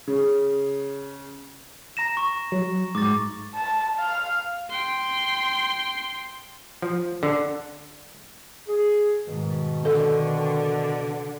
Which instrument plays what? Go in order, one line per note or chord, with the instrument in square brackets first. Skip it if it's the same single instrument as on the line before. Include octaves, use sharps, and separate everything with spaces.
[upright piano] C#3
[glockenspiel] A#5 A#6 E7
C#6
[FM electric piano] F#3
[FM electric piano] G#2 [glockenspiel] D6 A6
[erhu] A5
F5
[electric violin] G5 C6
[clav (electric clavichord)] F3
D3
[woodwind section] G#4
[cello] G#2 [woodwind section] B2 D#3
[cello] D3 [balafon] A4